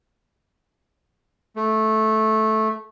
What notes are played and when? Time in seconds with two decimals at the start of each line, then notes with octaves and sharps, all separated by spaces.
1.56 A3